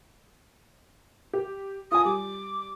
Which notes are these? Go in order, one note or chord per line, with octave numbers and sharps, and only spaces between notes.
G4
F4 G#5 D#6
G3 D6